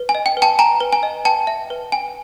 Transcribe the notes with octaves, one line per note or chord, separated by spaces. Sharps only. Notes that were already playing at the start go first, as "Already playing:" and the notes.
Already playing: B4
G#5
D#5
G5
B4
G5 A5
G5 G#5 A#5
B4
G#5
D#5
B4 G5 A5
E5
B4
G5 G#5